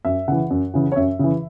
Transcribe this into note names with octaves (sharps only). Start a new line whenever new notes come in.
F#2 E5
C#3 E3 F#5
F#2
C#3 E3
C#5
F#2 E5
C#3 E3